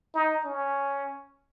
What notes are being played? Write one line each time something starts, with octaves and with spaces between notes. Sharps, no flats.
D#4
C#4